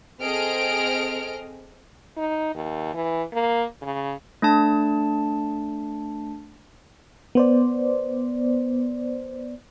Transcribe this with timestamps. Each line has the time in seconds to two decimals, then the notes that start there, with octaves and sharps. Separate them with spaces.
0.22 C4 G#4 A4 D#5 F6 D7
2.17 D#4
2.55 D#2
2.94 E3
3.33 A#3
3.82 C#3
4.42 A3 D4 A5
7.35 B3 C5 D5